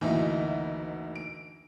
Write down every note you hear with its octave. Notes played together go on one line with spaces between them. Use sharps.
F#1 D2 E3 A#3 D#4 E5
D7